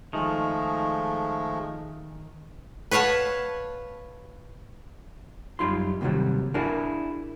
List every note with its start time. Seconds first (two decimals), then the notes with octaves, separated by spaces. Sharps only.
0.13 D#3 F3 G#3 A3
2.91 B4 C#5 F5 F#5 A5
5.59 F#2 G3 D#4 F4 B5 C6
6.01 D#2 G#2 C3 D#3 F#3 G3
6.54 D4 E4 F#4 G#4 A#4 D5